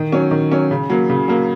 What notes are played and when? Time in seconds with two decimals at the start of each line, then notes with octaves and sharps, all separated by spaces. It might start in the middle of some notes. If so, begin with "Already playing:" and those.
Already playing: D#3
0.12 F#3 C#4
0.31 D#3
0.52 F#3 C#4
0.71 C#3
0.90 F#3 A#3
1.09 C#3
1.28 F#3 A#3